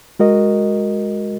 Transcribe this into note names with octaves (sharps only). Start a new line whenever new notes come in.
G#3 F#4 A#4 D#5